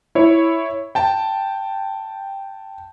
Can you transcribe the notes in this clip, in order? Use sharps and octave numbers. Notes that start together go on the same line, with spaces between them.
E4 C#5
G5 A5